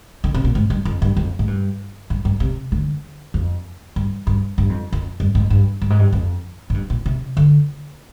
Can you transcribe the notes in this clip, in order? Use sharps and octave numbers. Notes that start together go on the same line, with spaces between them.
D3
C3
A#2
G#2
G2
F2
G2
F2
G#2
G2
G2
G2
C3
D3
F2
G2
G2
G2
F2
F2
G2
G#2
G2
G2
G#2
G2
F2
G#2
G2
A#2
C3
D3